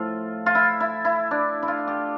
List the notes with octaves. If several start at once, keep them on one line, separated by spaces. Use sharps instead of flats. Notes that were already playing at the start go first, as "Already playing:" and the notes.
Already playing: A2 F3 F4 A4
F4
E4
E4
E4
D4
E4
F4
G4